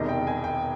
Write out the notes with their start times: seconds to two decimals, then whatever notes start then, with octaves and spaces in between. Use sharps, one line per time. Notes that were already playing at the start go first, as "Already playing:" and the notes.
Already playing: E1 E2 C3 D#3 G3 D#5
0.09 G5
0.27 G#5
0.44 G5